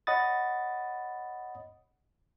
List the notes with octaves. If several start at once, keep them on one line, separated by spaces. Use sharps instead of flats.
C#5 D#5 F#5 B5 D#6 A6